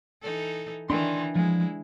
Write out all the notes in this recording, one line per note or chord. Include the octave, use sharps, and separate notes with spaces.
E3 D#4 A4
D#3 E3 D4 D#4 C6
F3 G#3 E4